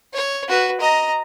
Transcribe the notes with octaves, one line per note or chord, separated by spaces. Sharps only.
C#5
F#4 B4
D#5 A#5